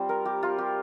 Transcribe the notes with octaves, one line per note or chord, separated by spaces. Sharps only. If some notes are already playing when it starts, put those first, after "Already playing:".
Already playing: G3 C4 F4 C5
A#4
G4
F4
G4